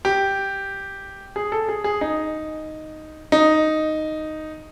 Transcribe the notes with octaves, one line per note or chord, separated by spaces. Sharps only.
G4
G#4
A4
G#4
G#4
D#4
D#4